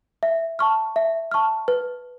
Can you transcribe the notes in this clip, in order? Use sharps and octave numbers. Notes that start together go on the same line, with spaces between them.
E5
A5 C#6 F6
E5
A5 C#6 F6
B4